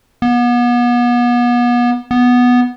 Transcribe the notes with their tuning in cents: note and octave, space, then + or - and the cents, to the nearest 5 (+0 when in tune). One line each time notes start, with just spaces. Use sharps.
B3 -35
B3 -5